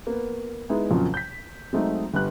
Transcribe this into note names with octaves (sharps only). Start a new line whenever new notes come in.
A#3 B3
G#3 B3 D#4 E4 G#4
F2 A#2 C#3 F#3
G6 B6
F#3 G#3 A3 C4 D#4
G1 G3 B4 F#6